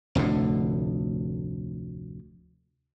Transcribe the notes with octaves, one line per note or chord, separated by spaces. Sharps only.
F1 D2 A2 D3